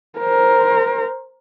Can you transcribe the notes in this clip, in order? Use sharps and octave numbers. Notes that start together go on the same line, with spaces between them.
A#4 C5